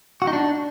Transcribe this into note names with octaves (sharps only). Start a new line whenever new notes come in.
F#4
D#4
D4